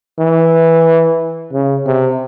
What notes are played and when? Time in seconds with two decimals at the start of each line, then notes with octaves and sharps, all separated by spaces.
0.19 E3
1.53 C#3
1.86 C3